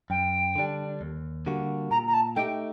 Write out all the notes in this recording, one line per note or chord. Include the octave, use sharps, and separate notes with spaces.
F#2 G5
D3 G3 D4
D#2
D3 G3 A#3 F#4
A#2 A#5
A#5
A5
A3 D#4 G4 G5